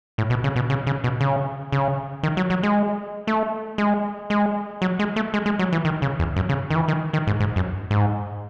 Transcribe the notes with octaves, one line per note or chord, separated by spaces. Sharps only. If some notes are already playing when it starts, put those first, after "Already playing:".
A2
B2
C#3
B2
C#3
C#3
B2
C#3
C#3
D#3
F#3
F#3
G#3
A3
G#3
G#3
F#3
G#3
A3
G#3
G#3
F#3
E3
D#3
C#3
E2
F#2
C#3
D#3
E3
D#3
D#3
G#2
G#2
F#2
G#2